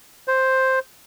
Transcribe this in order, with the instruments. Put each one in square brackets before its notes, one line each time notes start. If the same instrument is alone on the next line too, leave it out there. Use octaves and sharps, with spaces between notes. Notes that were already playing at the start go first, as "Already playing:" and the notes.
[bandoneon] C5